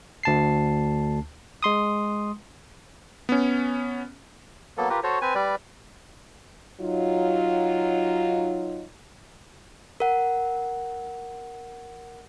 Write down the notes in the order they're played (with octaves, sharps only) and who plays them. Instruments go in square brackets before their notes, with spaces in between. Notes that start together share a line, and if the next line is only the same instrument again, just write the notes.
[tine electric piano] D2 A5 C7
G#3 C6 D#6
[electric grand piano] B3 C#4
[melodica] F#3 A#3 B3 A4
F4 G4 A#4 B4
F#4 A4 C5 C#5
C4 B4 G#5
G3 B4 D5
[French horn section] F#3 D#4 F4
[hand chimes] A#4 F#5